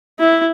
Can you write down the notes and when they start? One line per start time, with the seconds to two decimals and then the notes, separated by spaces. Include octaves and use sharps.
0.20 E4